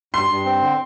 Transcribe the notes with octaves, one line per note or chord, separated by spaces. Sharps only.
G2 C6
G2
C4
D3